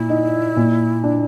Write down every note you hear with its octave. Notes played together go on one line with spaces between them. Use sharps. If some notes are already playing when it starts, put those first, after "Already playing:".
Already playing: A#2 E4
D#4
A#2
D4